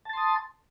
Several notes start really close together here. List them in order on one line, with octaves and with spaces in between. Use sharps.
A5 A6 C6 D#6